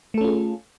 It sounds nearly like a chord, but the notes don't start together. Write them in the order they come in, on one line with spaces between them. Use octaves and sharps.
A3 A4 C#4 F4 G#4